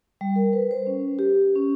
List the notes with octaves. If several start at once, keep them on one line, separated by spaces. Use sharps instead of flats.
G3
A#4
B4
C5
C#4
G4
C#4